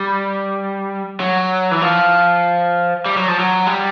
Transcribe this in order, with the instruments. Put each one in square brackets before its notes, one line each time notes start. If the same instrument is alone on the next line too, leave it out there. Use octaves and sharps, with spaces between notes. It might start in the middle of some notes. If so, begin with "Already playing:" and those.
Already playing: [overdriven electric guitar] G3
F#3
E3
F3
G3
F#3
F3
F#3
G3